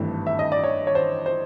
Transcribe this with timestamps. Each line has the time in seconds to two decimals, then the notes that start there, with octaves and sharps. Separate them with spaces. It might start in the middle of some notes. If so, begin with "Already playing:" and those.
Already playing: G#1 G2 E3 A3
0.27 E5
0.39 D#5
0.52 D5
0.64 C#5
0.87 C#5
0.95 C5
1.26 C5